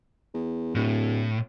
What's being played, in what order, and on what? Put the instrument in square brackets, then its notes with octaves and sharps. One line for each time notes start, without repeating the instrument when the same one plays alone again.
[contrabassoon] E2
[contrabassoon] D1 [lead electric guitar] A2